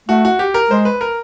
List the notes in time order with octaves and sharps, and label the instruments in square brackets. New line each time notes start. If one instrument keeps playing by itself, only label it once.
[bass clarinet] A3 [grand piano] F#4
[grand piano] F#4
G4
A#4
[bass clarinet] G#3 [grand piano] C5
[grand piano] B4
A#4